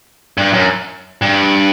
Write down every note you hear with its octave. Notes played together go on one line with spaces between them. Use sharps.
G2
F#2
G2